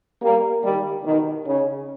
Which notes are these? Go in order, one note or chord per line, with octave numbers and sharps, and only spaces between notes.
G3 A#3
D#3 G3
B2 D#3
C#3